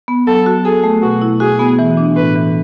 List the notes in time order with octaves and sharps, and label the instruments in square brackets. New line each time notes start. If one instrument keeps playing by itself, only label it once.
[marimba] B3
[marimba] F#3 [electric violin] A4
[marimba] F#4
[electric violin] G#4 [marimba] A4
[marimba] A3
[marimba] B2 [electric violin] F#4
[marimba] E4
[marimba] F#4 [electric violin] G#4
[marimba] B3
E3
D4
[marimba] A2 [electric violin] B4
[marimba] E3